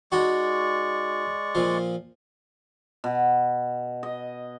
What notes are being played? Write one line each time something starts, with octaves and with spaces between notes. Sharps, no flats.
G#3 D#4 F#4 D5 C#6
A#2 F3
B2
D#5